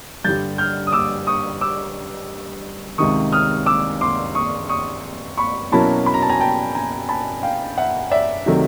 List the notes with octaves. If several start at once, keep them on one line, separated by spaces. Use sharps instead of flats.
G2 D3 G3 G6 A6
F6 G6
D#6
D6 E6
C#6 D#6
D6 E6
C#2 C3 D#3 C#6 D#6
D#6 F6
D6 E6
C6 D6
C#6 D#6
C#6 D#6
B5 C#6
B2 F#3 A#3 C#4 E4 A5 B5
B5
A#5
A5
G#5 A#5
G5 A5
G#5 A#5
A5 B5
F5 G5
E5 F#5
D5 E5
C3 D#3 F#3 A3